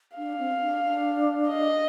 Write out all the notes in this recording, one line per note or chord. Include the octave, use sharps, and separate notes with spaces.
D4 F5
C4
D4
D4
D#5